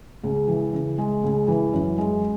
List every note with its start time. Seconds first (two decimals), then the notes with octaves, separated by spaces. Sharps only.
0.23 C#2
0.48 E3
0.73 C#3
0.98 G#3
1.24 C#2
1.48 E3
1.73 F#2
1.98 G#3